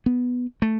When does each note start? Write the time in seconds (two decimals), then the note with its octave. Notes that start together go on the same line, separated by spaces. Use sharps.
0.06 B3
0.62 A3